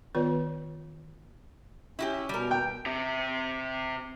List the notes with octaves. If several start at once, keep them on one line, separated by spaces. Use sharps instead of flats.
D#3 B3 F4 B4 C#5 D5
C#4 E4 F#4 G4
B2 G3 A#4
G5
C3 G4